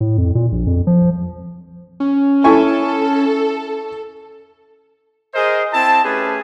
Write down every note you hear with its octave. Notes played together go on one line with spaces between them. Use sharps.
A2
F2
A#2
A#1
F2
F3
C#4
E4 A4 G#5 C#6
G#4 A#4 C5 D#5
C4 E4 A5
A3 C#4 G4 G#4 B4